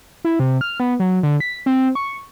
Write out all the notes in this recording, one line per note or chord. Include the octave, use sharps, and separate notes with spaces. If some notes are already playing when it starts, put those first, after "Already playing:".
E4
C3
F6
B3
F#3
D3
B6
C4
C#6